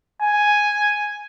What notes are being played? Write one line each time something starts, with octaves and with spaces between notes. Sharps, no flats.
G#5